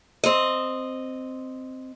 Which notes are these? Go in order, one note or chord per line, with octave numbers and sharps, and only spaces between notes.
C4 D#5